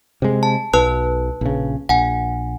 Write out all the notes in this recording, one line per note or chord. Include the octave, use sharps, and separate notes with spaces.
C3 G#3
A5
B1 B4 A5 F#6
A#1 C#3
A#1 F#5 G#5